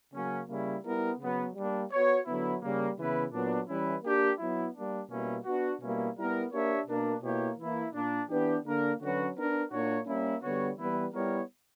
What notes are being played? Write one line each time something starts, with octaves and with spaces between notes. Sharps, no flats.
C#3 F#3 A#3 C#4
C#3 G3 A#3 C#4 E4
G3 B3 E4 A#4
C#3 F#3 B3
G3 A#3 D4
B3 F#4 C#5
D3 F#3 B3 E4
C#3 G3 A#3
C#3 E3 B3 E4 B4
A#2 F#3 B3 D4
E3 G3 C#4 E4 B4
A#3 D4 G4
F#3 B3 E4
G3 A#3 D4
B2 G3 A#3 C#4 E4
B3 D4 F#4
B2 G3 A#3 C#4 E4
G3 B3 E4 A#4
A#3 D4 G4 C#5 E5
B2 A#3 D4 A#4
B2 A#3 E4 G4 C#5
E3 A#3 E4
A#2 A#3 D4
E3 B3 D4 G4 B4
D3 A#3 D4 A#4
D3 F#3 C#4 F#4 B4
B3 D4 A#4
A#2 A#3 D4 F#4 C#5
G3 A#3 C#4 E4
D3 G3 B3 F#4 C#5
E3 G3 B3 E4 B4
G3 B3 E4 A#4 C#5